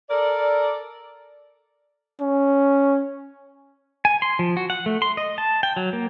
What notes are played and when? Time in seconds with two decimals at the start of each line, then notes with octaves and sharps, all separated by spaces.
0.09 A4 A#4 D5
2.21 C#4
4.05 G#5
4.22 C6
4.39 F3
4.57 F#4
4.70 F#5
4.86 A3
5.02 C6
5.17 D#5
5.38 A5
5.63 G5
5.76 F#3
5.93 A#3